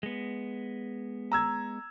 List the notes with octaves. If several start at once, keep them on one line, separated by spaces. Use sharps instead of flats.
G#3 B3
A#5 E6 G#6